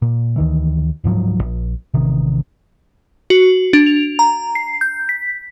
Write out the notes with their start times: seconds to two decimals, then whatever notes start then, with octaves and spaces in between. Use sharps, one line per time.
0.02 A#2
0.36 D2 D#3 E3
1.04 D1 G#2 F3 F#3
1.41 A#1
1.94 A1 C3 D#3
3.30 F#4
3.73 D4
3.86 F7
4.19 A#5
4.55 C7
4.81 G6
5.09 B6